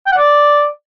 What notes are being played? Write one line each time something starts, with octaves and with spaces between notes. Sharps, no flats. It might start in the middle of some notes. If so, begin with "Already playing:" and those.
G5
F#5
D5